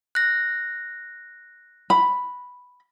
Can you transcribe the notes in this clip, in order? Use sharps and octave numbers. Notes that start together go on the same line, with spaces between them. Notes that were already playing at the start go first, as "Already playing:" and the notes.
F#6 A#6
B5